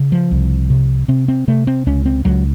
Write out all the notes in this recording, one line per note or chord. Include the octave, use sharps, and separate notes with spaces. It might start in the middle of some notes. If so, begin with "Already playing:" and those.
Already playing: C#3
F3
C2
C3
C3 C4
C4
C3 A3
C4
C#2 C#4
C4
C#2 F#3